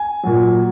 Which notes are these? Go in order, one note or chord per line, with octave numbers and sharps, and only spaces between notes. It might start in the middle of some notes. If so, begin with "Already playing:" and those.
Already playing: G#5
A#2 F#3